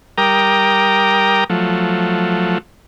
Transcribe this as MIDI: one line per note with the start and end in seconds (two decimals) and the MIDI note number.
0.18 1.44 55
0.18 1.44 70
0.18 1.44 79
0.18 1.44 82
0.18 1.44 86
0.18 1.44 87
1.50 2.58 53
1.50 2.58 54
1.50 2.58 57